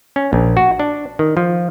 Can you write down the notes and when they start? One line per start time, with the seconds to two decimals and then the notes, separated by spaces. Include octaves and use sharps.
0.16 C#4
0.33 A#1
0.57 F#4
0.79 D4
1.19 D#3
1.37 F3